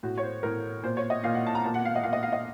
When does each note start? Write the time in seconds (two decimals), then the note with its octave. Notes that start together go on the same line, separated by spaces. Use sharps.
0.03 A2 F#4
0.17 C#5
0.23 C5
0.43 A2 A#4
0.83 A#2 C5
0.97 C#5
1.10 D#5
1.24 A#2 F5
1.34 F#5
1.47 A5
1.55 A#5
1.64 A#2 A5
1.74 F#5
1.85 F5
1.95 D#5
2.03 A#2 F5
2.13 D#5
2.23 F5
2.33 D#5